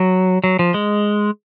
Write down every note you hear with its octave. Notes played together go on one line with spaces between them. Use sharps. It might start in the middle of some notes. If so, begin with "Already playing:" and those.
Already playing: F#3
F#3
F3
G#3